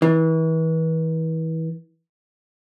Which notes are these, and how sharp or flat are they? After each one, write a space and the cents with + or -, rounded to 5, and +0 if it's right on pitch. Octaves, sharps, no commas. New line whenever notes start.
E3 -35